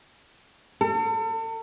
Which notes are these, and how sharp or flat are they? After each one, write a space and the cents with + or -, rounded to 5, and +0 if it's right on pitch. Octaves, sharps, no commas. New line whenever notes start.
A4 +40